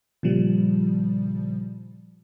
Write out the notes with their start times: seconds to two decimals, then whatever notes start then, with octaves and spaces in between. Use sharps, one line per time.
0.23 A#2 C#3 F3 G3